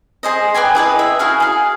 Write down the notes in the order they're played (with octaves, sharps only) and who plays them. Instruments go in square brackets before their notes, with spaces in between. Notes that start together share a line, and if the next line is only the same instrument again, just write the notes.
[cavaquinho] G#4 C5 D#5
B4 D5 G5 G#5
E4 G#4 B4 D#5
E5
E4 F#4 G#4 F5
G#4 F5